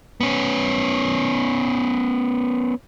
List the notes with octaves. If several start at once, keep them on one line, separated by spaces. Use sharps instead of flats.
B3 C#4